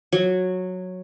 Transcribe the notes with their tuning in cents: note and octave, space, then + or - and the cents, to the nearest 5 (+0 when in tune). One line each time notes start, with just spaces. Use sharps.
F#3 -10